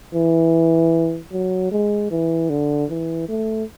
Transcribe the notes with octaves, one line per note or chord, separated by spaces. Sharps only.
E3
F#3
G#3
E3
D3
E3
A3